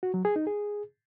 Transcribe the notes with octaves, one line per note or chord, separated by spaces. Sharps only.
F#4
F#3
G#4
D#4
G#4